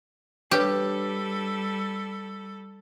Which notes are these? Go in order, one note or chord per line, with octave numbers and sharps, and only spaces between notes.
G3 D4 G4 A4 B4 C#5